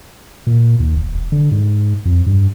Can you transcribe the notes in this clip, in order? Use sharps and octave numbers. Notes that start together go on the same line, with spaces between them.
A#2
D#2
E1
E1
D3
G#2
F2
G2